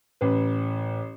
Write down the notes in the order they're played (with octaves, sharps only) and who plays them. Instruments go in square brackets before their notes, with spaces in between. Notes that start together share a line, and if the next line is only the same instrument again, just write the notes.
[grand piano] A1 B4